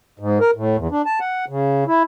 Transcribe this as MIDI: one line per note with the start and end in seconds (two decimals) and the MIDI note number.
0.19 0.38 44
0.40 0.51 70
0.56 0.77 45
0.77 0.87 40
0.92 1.02 62
1.06 1.19 81
1.20 1.45 78
1.49 1.84 49
1.87 2.03 64